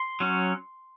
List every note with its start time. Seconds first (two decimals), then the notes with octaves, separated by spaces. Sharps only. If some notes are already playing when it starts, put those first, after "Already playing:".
Already playing: C6
0.20 F#3 C#4